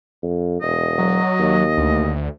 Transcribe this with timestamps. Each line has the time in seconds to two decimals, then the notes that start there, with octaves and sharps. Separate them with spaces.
0.23 F2
0.62 E1 D#5
0.98 F#3
1.40 D#2
1.77 D2